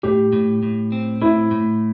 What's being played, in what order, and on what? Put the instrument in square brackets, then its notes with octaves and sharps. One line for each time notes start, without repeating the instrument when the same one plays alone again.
[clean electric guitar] A2 [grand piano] G4
[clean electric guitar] A2
A2
C4
[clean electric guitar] A2 [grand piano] E4
[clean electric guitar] A2